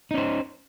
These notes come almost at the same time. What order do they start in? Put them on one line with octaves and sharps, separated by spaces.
D#4 C#4 C5